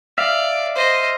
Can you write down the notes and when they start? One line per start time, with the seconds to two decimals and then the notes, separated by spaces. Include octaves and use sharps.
0.18 D5 E5 F5
0.76 C5 D#5